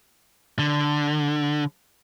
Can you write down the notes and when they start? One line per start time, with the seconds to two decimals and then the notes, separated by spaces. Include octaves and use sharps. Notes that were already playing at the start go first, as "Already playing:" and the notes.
0.59 D3